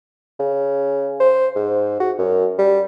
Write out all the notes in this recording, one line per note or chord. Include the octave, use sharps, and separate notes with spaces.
C#3
C5
G#2
F#4
F#2
G3